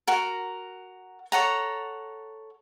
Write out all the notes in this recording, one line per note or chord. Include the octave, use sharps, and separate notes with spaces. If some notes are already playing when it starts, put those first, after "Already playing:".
F#4 A#4
A4 C#5 F#5 A#5